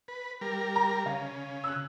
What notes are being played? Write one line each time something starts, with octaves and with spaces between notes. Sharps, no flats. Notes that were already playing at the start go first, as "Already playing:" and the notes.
B4
G3 A#4
A#5
C#3 F5
E6 F#6